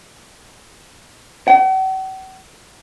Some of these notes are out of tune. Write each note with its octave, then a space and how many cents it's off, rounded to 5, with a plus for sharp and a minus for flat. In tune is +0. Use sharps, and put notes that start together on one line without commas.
F#5 +45